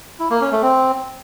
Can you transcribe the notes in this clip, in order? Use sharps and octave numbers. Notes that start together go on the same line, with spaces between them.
E4
A#3
C#4
A3
C4